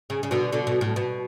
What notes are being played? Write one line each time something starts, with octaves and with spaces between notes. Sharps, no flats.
C#3
C#3
B2 D3
B2 D3
B2
A2
B2